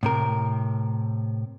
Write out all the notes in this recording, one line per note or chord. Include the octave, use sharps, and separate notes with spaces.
A2 C3 A#4